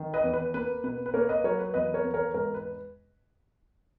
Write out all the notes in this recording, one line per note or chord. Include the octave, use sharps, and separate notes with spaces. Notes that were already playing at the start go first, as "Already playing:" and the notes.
Already playing: D#3
B4 D#5
E2
B4
A#3 B4
B2 B4
B4
A#3 A#4 C#5
B4 D#5
F#3 A#4 C#5
B4
E2 B4 D#5
A#4 C#5
E2
A#4 C#5
G#2 A#4
B4